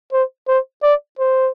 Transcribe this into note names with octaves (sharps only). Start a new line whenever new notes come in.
C5
C5
D5
C5